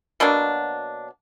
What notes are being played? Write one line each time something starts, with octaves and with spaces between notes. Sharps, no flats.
B2 F#3 A#3 D4